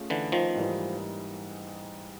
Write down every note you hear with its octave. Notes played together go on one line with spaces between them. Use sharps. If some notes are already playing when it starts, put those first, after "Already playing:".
Already playing: A3 C#4 F4 G#4
D3 E3
D#3 F3
G#2 E3 G3 A#3 D#4